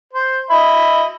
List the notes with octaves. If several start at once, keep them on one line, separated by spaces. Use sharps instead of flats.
C5
D#5 E5 B5